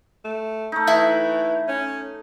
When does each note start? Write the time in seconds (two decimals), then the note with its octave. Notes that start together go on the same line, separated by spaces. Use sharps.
0.25 A3
0.72 A3 D#4
0.87 E3 E4
1.68 C#4